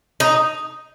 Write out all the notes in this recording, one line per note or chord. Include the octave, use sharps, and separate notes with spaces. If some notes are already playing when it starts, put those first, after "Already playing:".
D#4